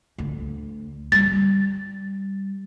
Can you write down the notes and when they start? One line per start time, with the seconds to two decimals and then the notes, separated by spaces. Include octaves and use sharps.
0.18 D2
1.12 G3 A6